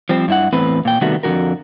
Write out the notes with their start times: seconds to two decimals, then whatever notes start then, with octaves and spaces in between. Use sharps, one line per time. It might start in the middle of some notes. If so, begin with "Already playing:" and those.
0.09 F3 G3 C4
0.28 G2 E4 F#5
0.53 E2 A2 C4 B4
0.85 A#2 G5
1.01 C3 D#3 G3 A3 B3 F#4
1.23 F2 D3 D#3 F#4 A#4